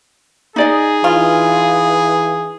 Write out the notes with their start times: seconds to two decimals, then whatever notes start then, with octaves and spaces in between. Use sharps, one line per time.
0.56 D#4 G#4 D5 D#5
1.04 E3 F4